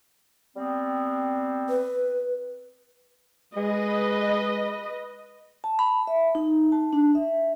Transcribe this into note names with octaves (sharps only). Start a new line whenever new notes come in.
G3 B3 C4
B4
G#3 B4 D#5
A5
B5
E5
D#4
A5
D4
E5